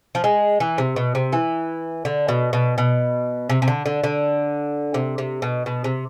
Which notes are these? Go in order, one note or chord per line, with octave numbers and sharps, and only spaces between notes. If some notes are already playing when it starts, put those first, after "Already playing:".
F3
G#3
E3
C3
B2
C3
E3
D3
B2
B2
B2
C3
C3
D3
D3
D3
C3
C3
B2
B2
C3